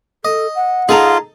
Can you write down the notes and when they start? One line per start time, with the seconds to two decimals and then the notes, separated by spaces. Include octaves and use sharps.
0.25 A4 D#5
0.55 F#5
0.89 D#4 F4 G#4 A4 A#5